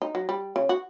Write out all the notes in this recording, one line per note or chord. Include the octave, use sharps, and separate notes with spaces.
D#4
F#3
G3
C#3
F#4